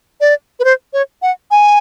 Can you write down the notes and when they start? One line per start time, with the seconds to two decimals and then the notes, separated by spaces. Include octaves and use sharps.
0.21 D5
0.60 B4
0.64 C5
0.93 C#5
1.22 F#5
1.51 G#5